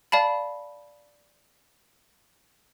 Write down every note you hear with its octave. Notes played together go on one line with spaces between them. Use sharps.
D5 F5 A5 B5